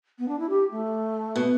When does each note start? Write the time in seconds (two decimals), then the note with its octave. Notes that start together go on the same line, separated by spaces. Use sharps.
0.19 B3
0.28 D4
0.39 E4
0.50 G4
0.72 A3
1.36 B2